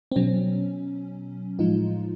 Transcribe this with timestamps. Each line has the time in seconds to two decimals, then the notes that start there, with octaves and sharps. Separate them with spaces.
0.12 C4
0.16 B2 F#3 C#4
1.59 A2 F3 G#3 D#4 F4